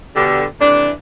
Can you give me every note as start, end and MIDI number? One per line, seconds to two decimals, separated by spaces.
0.15 0.44 47
0.15 0.44 50
0.15 0.44 55
0.59 0.90 48
0.59 0.90 52
0.59 0.90 57
0.59 0.90 62